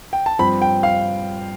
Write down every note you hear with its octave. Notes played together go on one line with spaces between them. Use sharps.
G5
A5
G2 F3 C4 B5
G5
F5